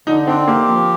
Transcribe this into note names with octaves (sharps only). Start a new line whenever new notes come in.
D3 D#4
C4 D4
A#3 G4
F3